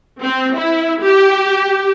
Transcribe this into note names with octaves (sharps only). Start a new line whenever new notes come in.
C4
E4
G4